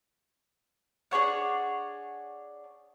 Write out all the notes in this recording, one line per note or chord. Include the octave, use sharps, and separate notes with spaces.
D4 G#4 C#5 F#5